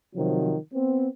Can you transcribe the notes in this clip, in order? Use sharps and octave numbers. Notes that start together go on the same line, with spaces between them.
C3 D#3 F3 F#3
B3 C4